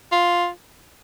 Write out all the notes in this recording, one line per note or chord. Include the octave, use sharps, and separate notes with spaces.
F4